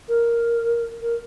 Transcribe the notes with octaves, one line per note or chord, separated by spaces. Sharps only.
A#4
A#4